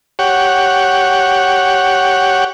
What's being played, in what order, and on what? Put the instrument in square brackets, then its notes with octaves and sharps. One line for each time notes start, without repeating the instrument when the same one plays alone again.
[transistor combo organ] G4 C#5 F#5